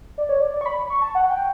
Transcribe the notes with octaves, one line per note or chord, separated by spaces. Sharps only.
D5
C#5
D5
D5
C#6
B5
C#6
A5
F#5
G5